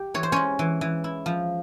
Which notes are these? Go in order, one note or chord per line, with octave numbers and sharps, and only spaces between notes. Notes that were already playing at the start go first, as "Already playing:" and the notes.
Already playing: G4 G5
E3 C#5
C5
G#3 C#4 C#5
E3
E3
E4
F3